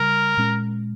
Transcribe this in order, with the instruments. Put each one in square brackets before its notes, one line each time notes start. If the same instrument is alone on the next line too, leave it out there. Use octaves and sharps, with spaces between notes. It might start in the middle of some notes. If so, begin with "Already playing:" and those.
Already playing: [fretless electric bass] C#3 G3 [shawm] A#4
[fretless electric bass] A#2 G#3 C#4